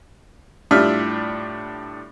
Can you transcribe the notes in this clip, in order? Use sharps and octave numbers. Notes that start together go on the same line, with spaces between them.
A2 G3 D4 F4 E5 F6